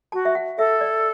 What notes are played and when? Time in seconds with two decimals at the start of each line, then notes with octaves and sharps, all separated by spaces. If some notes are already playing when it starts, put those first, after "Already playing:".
0.12 F#4 A5
0.25 E5
0.35 F#5
0.58 A4 E5
0.81 D5